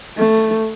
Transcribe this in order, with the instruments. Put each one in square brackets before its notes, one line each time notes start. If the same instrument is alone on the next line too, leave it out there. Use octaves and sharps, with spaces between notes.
[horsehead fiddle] A3